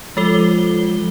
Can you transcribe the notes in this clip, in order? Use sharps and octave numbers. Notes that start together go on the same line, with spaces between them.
F3 G#3 A4 G7